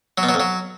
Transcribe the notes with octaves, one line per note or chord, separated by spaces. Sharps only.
F#3
B2
F#3
F2
F#3